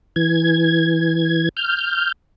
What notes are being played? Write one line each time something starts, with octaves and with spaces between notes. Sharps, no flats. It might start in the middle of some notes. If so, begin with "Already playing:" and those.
E3 G#6
F6 G6